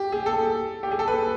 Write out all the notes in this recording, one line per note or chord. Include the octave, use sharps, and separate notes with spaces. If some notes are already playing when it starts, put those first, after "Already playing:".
Already playing: G4
G#4
A4
G4
G#4
A4
B4